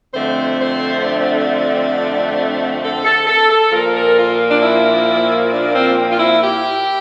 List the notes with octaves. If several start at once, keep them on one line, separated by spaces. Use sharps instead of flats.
F2 D3 A3 C4 C5
C5
D4
A4
A4
A4
A4
A#2 F3 A#3 A#4
A#4
F4
D4
E4
D4
C4
F4
E4
G4